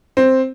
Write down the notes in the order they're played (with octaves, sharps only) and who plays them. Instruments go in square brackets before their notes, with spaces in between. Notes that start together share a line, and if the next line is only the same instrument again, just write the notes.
[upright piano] C4